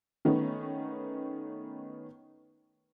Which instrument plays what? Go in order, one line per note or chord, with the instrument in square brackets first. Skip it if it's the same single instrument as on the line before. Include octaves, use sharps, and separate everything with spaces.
[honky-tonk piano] D#3 A3 B3 C#4